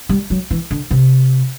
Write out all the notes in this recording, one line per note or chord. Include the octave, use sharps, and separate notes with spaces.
G3
F#3
E3
D3
C3